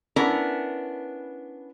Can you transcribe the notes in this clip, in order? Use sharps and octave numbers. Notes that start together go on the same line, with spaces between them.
B3 C#4 D4 E4 A#4